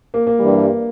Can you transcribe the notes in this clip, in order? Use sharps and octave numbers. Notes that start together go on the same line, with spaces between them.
A#3
A#3
G2 E3 G3